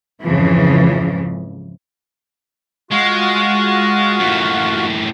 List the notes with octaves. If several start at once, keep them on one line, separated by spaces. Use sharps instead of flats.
F2 G#2 C#3 E3 F3
G#3 F4 F#4
F#2 A2